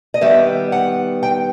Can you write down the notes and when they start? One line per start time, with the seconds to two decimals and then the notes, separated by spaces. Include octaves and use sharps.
0.14 D#5
0.21 D#3 G3 B3 E5
0.72 F#5
1.23 G5